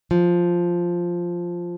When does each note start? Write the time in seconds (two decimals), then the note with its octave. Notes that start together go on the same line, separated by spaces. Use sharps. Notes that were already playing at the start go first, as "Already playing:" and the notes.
0.11 F3